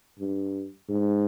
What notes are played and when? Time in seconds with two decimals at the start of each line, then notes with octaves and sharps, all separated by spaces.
0.19 G2
0.89 G#2